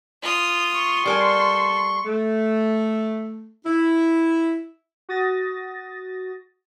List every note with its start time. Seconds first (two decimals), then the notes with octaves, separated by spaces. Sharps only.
0.22 F4 D#6
0.74 C6 C#6
1.06 G3 A4 A#4 G#5
2.05 A3
3.65 E4
5.09 F#4 D#6 A6 A#6